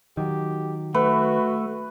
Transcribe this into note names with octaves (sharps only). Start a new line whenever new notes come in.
D#3 F#3 G4
A3 F#4 B4